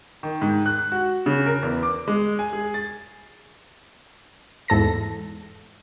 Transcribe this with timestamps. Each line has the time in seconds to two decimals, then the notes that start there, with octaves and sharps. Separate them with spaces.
0.23 D#3
0.42 G#2
0.66 F#6
0.92 F#4
1.26 C#3
1.46 A#4
1.63 E2
1.83 D6
2.08 G#3
2.39 G#5
2.53 G#4
2.74 A6
4.68 E2 G#2 A4 A#6